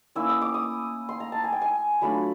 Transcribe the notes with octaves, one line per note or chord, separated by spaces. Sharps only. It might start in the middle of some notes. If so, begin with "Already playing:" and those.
A#3 C#4 E4 E6
D#6
D6
D#6
C6
A#5
A5
G#5
G5
G#5
F#3 A3 D4 F4 B5